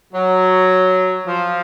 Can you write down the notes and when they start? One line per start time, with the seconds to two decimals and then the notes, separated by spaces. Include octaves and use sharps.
0.13 F#3
1.26 F3